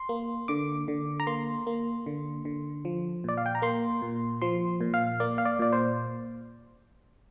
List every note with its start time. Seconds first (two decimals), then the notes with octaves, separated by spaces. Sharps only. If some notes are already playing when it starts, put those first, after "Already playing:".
Already playing: C6
0.09 A#3
0.48 D3 D6
0.88 D3
1.20 A#5
1.27 A#3 C6
1.67 A#3
2.06 D3
2.45 D3
2.85 F3
3.24 A#2 D5
3.37 F5
3.46 G5
3.55 A#5
3.62 A#3 C6
4.02 A#2
4.42 F3 C6
4.81 A#2
4.94 F5
5.20 A#3 D5
5.38 F5
5.45 D5
5.59 A#2 D5
5.73 C5